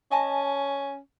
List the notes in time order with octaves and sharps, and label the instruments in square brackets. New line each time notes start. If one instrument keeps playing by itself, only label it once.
[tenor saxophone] C#4 [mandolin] D#5 G#5 A5